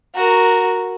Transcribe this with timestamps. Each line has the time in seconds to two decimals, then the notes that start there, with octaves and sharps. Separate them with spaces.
0.16 F#4 A#4